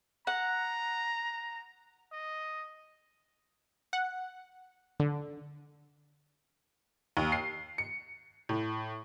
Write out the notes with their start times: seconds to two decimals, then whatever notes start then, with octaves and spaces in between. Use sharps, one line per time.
0.27 F#5 A#5
2.12 D#5
3.93 F#5
5.00 D3
7.17 D#2
7.32 C7
7.78 C#7
8.49 A2